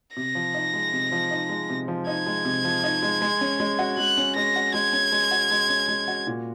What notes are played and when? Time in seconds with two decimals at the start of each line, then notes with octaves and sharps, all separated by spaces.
0.16 C3 A#6
0.35 F3
0.55 D#4
0.74 G#3
0.93 C3
1.12 F3
1.31 D#4
1.49 G#3
1.70 C3
1.88 F3
2.07 D#4 G#6
2.26 G#3
2.45 C3
2.65 F3
2.84 D#4
3.03 G#3
3.22 G#3
3.41 C#4
3.60 G#3
3.79 F#4
3.98 G#3 F#6
4.17 C#4
4.36 G#3 A#6
4.56 F#4
4.74 G#3 G#6
4.93 C#4
5.12 G#3
5.31 F#4
5.51 G#3
5.69 C#4
5.88 G#3
6.08 F#4
6.27 A#2